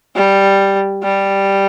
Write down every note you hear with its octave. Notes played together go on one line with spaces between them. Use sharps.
G3
G3